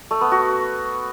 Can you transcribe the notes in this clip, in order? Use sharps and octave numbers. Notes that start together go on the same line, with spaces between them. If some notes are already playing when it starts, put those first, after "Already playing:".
A3
B3
F#4